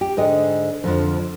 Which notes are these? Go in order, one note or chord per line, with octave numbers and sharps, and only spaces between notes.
G4
G#2 D3 D#5
F2 D3 F3